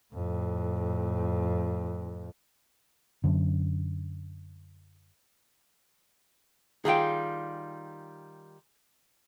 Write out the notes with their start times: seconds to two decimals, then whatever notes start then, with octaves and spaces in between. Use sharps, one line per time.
0.14 F2 A2
3.24 F#2 D3
6.85 D#3 G3 F4 G#4 G5